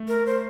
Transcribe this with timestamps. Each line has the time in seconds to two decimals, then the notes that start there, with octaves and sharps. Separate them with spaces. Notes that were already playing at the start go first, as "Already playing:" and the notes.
Already playing: A3
0.08 A#4
0.26 C5